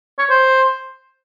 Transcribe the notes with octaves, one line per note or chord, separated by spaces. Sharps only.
C#5
C5